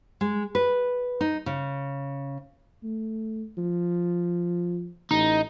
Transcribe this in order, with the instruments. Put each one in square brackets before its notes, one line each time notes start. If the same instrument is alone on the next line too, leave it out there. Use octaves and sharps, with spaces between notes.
[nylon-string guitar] G#3
B4
D#4
C#3
[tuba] A3
F3
[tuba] A1 [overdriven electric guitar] D#4